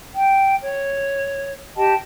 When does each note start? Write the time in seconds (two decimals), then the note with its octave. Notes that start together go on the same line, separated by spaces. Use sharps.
0.13 G5
0.61 C#5
1.77 G4 D#5 G5 A5